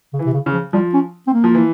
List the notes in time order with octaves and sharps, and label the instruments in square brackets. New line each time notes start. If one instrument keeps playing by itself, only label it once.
[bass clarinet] C#3
[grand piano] E3
[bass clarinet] C3
C#3
[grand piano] C#3
[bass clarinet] F3
[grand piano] F3 [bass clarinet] G3
[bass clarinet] C#4
C4
A#3
[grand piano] F3
E3